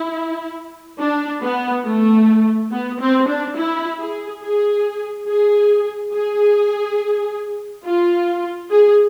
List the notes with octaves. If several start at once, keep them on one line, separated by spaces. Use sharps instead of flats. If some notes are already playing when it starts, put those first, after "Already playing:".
Already playing: E4
D4
B3
A3
B3
C4
D4
E4
G#4
G#4
G#4
G#4
F4
G#4